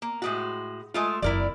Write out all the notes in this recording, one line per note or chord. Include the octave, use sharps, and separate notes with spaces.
A#3
A2 G#3 F#4
G#3 A3 F4
F#1 C4 E4 A#4 D5